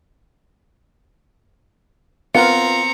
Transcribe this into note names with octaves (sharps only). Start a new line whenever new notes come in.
B3 C4 F4 A#4 F#5 A#5 C#7